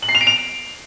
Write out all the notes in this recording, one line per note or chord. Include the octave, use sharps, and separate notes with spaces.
F#7
C7
F7
D7
F7